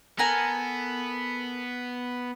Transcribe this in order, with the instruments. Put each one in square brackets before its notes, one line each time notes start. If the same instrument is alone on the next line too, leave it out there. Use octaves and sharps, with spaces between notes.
[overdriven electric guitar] B3 [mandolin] A4 A#4 G#5